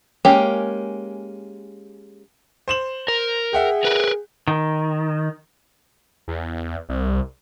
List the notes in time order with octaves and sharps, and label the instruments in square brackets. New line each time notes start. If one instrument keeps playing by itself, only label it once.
[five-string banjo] G#3 A#3 C#4 G4
[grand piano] C5 E7 F#7
[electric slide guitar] A#4
[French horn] G#4 [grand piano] E5 F#5 G5
[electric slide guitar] A#4 B4
D#3
[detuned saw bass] E2
C2